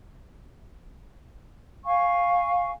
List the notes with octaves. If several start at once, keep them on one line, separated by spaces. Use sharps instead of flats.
F5 G#5 C#6